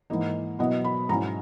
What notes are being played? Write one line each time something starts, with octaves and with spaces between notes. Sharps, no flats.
G#2 E3 A#3 D#4
B2 F#3 B3 E4 D#5
B5
G#2 F#3 C#4 E4 A#5